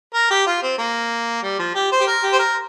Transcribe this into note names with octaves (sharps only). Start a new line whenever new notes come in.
A#4
G4
F4
C4
A#3
G3
F3
G4
C5
G4
A#4
G4
C5
A#4